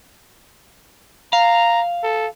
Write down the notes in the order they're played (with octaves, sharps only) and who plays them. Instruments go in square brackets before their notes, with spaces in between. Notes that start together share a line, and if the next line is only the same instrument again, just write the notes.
[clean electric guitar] F5 [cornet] A#5
[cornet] A4